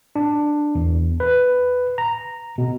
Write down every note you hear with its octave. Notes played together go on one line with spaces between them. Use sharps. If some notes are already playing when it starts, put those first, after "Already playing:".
D4
E2
B4
A#5
B2